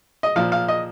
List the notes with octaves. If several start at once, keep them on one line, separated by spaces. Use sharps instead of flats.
D#5
A#2 F3 F5
F5
D#5